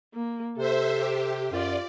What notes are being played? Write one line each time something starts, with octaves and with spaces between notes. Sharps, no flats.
A#3
C3 A4 C5 E5
G4
F#2 F4 D5